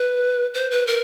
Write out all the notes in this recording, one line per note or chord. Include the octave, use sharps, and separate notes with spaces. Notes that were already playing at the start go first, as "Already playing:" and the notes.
Already playing: B4
C5
B4
A#4